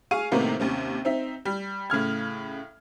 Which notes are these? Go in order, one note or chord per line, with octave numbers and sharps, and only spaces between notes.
G#4 F5 C#6 D#7
A2 C3 D#3 A#3 B3 D#4
D#2 C3 C#4
C4 D#4 E5
G3
A2 C#3 F6 G#6